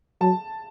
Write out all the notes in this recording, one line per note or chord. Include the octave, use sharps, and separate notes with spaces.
F#3 A5